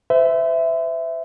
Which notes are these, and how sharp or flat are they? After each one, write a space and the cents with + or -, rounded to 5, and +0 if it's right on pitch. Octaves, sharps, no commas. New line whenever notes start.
C5 -40 E5 +0